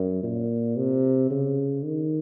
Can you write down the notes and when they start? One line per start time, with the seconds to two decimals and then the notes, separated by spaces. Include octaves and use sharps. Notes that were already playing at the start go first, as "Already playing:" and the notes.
Already playing: F#2
0.23 A#2
0.76 C3
1.30 C#3
1.85 D#3